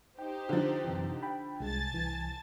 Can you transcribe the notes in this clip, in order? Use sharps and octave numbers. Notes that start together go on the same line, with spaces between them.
D#4 G4 C5 G5
D3 F3
F#2 C3 E3
G5 B5
C2 G#3 G#5 A5 A6
C2 E3